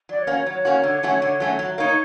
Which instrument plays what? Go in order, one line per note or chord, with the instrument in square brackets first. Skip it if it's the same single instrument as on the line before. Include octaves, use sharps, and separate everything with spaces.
[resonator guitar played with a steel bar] F#3 [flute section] D5
[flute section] C#5
[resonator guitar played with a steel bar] A#3 C#4 F#4
[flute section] C#5
[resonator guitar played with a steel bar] F#3 [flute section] C#5
[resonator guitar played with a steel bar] A#3 C#4 F#4
D3
F#3 A3 C#4 F#4
D3
F#3 A3 C#4 F#4
F#3
[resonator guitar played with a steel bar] A#3 D#4 [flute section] C#5